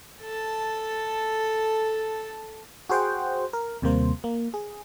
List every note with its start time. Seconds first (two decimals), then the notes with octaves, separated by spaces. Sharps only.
0.22 A4 A5
2.89 F#4 G#4 C5 F#5 G5
3.53 A#4
3.82 D#2 C3 G3 A#3 C5
4.24 A#3
4.54 G#4